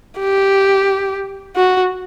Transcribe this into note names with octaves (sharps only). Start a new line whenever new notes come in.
G4
F#4